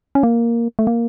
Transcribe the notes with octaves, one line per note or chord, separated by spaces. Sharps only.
C#4
A#3
A3
A#3